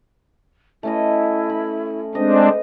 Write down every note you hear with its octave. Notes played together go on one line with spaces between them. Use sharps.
A3 C#4 E4 D#5
B5
G#3 C4 D4 C5 D#5